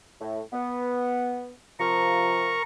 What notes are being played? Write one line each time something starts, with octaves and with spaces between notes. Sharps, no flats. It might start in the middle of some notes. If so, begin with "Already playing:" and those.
A2
B3
C3 F3 A#4 A#5 C#6